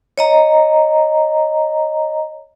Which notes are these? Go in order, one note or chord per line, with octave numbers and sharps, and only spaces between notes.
C#5 D#5 A#5